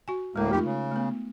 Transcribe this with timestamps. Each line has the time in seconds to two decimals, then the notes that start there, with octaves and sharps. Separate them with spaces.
0.08 F#4 G#5
0.36 D2 A2 G#3 A#3 A#4
0.51 F2 A3 D#4 F4 G4
0.64 C#3
0.92 A3 B3